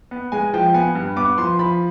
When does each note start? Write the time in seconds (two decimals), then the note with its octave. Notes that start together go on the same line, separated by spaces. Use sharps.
0.11 B3
0.32 G#3 G#5
0.53 F3 G5
0.74 B3 G#5
0.95 G2
1.16 B3 D6
1.38 F3 C6
1.59 F3 B5